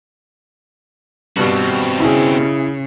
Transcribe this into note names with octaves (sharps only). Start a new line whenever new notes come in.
G2 B2 G3 C4 F#4
C#3 E4 G#4